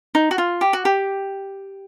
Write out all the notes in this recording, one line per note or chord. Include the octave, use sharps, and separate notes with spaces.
D#4
F#4
F4
G4
F#4
G4